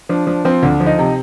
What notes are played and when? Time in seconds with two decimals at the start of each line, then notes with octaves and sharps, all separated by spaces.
0.09 F3 D4
0.27 F3 D4
0.45 F3 C4
0.63 D2 D4
0.80 F3
0.86 D#4
0.98 C3